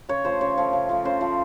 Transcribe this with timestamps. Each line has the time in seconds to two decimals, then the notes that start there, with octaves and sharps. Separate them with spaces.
0.09 C#3 C#5
0.25 F3 A3 C5
0.41 C#3 C#5
0.58 F3 A3
0.73 C#3
0.89 F3 A3
1.05 C#3 C5
1.21 F3 A3